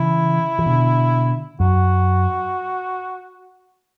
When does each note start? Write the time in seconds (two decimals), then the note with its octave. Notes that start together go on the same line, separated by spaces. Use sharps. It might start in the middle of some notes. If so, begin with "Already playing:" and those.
Already playing: C#3 E3 E4
0.59 E3
0.66 B2 D3
1.60 F#2 F#4